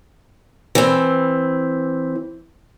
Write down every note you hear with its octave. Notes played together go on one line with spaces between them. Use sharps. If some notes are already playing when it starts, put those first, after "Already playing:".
E3 C4